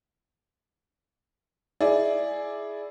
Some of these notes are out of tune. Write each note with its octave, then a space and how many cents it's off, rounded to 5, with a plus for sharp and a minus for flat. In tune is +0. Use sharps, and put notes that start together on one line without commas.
E4 +0 G#4 +10 D5 +0